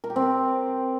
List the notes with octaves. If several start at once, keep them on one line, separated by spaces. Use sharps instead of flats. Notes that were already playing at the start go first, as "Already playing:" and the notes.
A#4
G4
C4
A#4